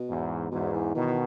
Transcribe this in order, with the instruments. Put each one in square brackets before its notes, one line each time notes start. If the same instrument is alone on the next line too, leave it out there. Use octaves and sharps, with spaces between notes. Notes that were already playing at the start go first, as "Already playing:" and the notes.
Already playing: [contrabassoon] B2
[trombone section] E2 G#2
[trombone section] E2 G#2 [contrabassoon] B2
[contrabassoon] E3
[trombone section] B2 D#3 [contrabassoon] E3
[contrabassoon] E3